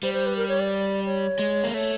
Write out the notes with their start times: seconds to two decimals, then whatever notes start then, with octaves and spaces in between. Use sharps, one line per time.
0.03 G3 C5
0.14 C5
0.26 B4
0.37 A#4
0.49 C#5
0.60 D5
1.06 C#5
1.39 G#3
1.64 A#3
1.73 A3 C#5